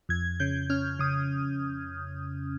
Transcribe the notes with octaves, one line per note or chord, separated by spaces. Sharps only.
F2 G#6
C#3 G6
C#4 F6
C#3 D#6